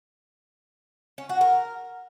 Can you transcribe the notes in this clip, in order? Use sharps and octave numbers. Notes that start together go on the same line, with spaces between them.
C#4
F#4
A#4